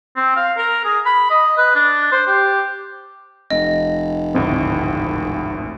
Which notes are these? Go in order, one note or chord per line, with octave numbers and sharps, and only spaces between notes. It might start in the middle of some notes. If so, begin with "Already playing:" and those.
C4
F5
A#4
G#4
B5
D#5
B4
D4
C5
G4
F1 D#5
G#1 D2 A2 C4